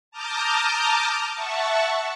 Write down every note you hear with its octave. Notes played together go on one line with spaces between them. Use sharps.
A5 A#5 D6 D#6 F6 G6
E5 F#5 A5 C#6